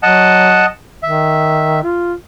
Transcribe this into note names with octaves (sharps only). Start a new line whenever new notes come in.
F#3 D#5 F#5 A5
D#3 E5
F4